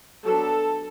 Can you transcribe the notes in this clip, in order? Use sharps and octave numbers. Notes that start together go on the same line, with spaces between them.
F#3 B3 D4 A4